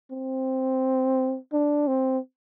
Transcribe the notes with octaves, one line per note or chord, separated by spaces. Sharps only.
C4
D4
C4